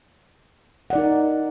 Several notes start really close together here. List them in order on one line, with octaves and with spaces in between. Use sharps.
F#5 D5 D#4 A#4